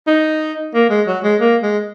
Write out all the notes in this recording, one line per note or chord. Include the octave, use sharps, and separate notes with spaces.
D#4
A#3
G#3
F#3
G#3
A#3
G#3